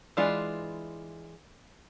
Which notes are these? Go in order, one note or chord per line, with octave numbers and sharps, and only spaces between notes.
E3 G#3 D4 F4